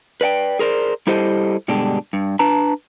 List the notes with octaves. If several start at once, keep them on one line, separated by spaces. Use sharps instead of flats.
B4 D5 F#5 G5
G#4 A#4 C5 D5
G3 E4 G4 A4 C5 D#5
G2 B2 D3 G#3 D4 G4
G2
D4 B4 A5 A#5